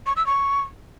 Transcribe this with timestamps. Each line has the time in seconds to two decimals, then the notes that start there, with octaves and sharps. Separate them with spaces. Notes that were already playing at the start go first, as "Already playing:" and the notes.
0.06 C#6
0.16 E6
0.26 C#6